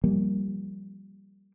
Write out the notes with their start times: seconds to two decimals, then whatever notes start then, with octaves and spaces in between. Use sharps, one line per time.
0.04 F3 G3 A#3